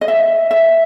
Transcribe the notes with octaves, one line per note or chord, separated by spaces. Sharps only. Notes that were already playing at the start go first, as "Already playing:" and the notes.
D#5
E5
E5